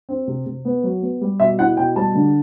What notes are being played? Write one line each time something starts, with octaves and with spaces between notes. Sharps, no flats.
C4
C3
C3
B3
F#3
B3
G3
B2 E5
E4 F#5
B2 G5
G3 A5
D3